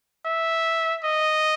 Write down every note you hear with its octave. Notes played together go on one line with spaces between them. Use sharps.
E5
D#5